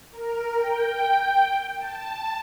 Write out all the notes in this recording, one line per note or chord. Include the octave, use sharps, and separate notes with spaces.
A#4
G5
A5